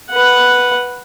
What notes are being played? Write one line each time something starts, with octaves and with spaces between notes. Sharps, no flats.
B4 F#5